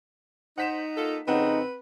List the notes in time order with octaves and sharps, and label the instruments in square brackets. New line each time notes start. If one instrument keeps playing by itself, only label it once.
[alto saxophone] D#4 [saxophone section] C5 [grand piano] F#5 B6 E7
[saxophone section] A#3 F4 A4
[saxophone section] F2 C#3 [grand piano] C4 F#5 [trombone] D#4 [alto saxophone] B4